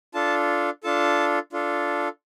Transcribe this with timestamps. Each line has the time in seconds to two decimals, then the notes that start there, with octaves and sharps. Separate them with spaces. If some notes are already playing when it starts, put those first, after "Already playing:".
0.14 D4 F4 A4 A5
0.84 D4 F4 A4 A5
1.53 D4 F4 A4